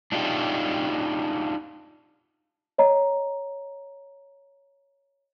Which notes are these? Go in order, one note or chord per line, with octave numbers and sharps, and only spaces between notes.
D4 D#4 F4 G4
C#5 D#5 A#5